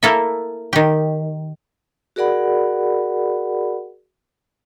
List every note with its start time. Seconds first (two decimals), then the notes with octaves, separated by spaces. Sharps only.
0.03 A#3 E4 A4 A#4 E5
0.73 D#3 G4
2.16 F#4 G#4 A#4 D5 F#5 B5